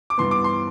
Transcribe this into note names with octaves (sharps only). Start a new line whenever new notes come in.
D6
G2 E3 B3 C6
D6
C6